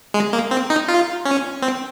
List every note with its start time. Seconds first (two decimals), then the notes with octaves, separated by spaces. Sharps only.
0.14 G#3
0.33 A#3
0.51 C4
0.70 D#4
0.88 F4
1.25 C#4
1.62 C4